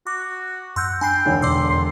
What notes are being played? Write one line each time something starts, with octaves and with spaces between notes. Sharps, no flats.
F#4 D6
F#2 F#5 C6 E6 G6
D4 G5 G#5 B5 C7
E1 D3 C#5
E2 B2 D5 C6 D6 E6
E2 C6